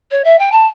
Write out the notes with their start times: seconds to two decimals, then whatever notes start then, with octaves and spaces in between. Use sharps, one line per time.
0.11 C#5
0.24 E5
0.39 G5
0.52 A5